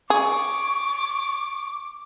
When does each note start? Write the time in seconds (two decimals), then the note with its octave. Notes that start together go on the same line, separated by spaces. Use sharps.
0.10 G#4 C#6 D6